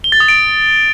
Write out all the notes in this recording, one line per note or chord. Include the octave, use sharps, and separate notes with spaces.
G7
A6
D#6
D7